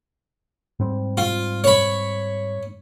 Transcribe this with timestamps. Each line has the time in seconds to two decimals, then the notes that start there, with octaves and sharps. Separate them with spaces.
0.79 G#2 G3 C4
1.17 F4
1.64 C#5 B5